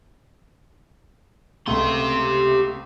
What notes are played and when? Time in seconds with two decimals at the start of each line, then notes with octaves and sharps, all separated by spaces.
1.67 C#2 C3 A3 G4 C6